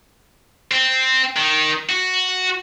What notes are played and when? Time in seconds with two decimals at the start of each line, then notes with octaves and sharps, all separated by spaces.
0.71 C4
1.37 D#3
1.89 F#4